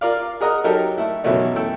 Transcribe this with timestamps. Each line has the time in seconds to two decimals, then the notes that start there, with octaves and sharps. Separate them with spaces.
0.01 F4 A#4 D5 F5
0.41 G#4 A#4 D#5 F#5 A#5
0.64 F#3 D#4 G4 A4 A#4
0.98 A3 E4
1.24 F#2 B2 E3 F#3 A3 D#4
1.56 A3 E4 G5